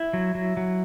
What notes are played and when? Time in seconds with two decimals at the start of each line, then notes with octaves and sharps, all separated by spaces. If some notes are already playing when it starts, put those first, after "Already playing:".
Already playing: E4 E5
0.13 F#3
0.35 F#3
0.57 F#3